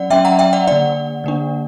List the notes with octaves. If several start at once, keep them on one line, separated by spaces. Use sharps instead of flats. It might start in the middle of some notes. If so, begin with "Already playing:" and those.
Already playing: F#3 C#4 D5 F#5
F#3 C#4 E5 G5
F#5 A#5
E5 G5
D5 F#5
D3 A#3 D4 D5 F#5
D3 A#3 D4